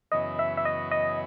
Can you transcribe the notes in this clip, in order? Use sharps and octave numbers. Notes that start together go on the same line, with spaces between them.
F#2 C#3 E3 B3 D#5
E5
E5
D#5
D#5